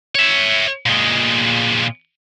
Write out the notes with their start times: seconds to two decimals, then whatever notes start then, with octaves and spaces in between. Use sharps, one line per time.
0.15 C#5 E5
0.86 A#2 G#3